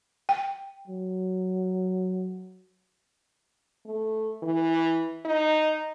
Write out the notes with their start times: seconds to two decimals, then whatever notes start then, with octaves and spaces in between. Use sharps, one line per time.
0.29 G5
0.88 F#3
3.86 A3
4.43 E3
5.25 D#4